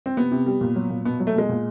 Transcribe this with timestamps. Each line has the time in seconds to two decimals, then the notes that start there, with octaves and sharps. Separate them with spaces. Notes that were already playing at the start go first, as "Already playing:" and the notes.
0.06 C4
0.17 C3 B3
0.31 C3
0.46 G3
0.61 A#2
0.76 F#3
0.90 A#2
1.05 B2 B3
1.20 F#3
1.27 A3
1.35 B2 G#3
1.49 A#2